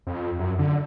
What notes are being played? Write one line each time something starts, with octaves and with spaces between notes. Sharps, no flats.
F2
F#2
D3